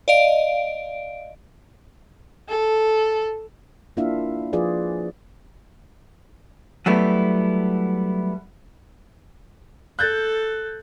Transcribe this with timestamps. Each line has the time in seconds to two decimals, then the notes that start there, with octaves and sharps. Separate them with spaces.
0.08 D5 D#5 F5 D7
2.49 A4
3.97 A#3 D4 E4 F4 E5 F5
4.53 F3 F4 G#4 B4 D5
6.86 F#3 G3 A3 B3 E4
9.99 A4 F#6 G6 A6